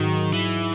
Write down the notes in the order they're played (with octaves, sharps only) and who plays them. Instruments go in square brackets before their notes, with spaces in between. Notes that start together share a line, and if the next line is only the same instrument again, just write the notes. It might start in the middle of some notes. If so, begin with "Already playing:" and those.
Already playing: [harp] G#2 F#3 B3 D#4 F#4 [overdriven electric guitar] D#3
[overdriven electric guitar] E3